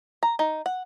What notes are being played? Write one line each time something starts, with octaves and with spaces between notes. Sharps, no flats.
A#5
D#4
F#5